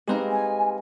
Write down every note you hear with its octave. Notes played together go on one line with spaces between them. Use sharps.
G#3 C4 D#4 G4 B4 F5
G#5